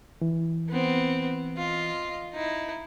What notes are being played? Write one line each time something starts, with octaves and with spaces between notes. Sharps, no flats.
E3
B3 C4
F4 D#5
D#4 E4